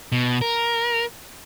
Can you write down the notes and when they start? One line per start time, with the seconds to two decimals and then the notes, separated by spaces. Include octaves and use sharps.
0.12 B2
0.41 A#4